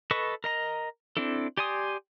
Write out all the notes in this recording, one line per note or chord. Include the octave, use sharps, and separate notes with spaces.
A4 B4 D#5 C#6
A#4 D#5 A#5
C4 D4 E4 A4
G4 D5 G#5 C6 D#6